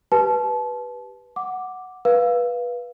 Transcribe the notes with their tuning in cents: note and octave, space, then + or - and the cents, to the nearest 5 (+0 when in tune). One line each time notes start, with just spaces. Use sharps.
G4 +0 B4 -10 A5 -30
F#5 +0 D6 +0
B4 -15 F5 +0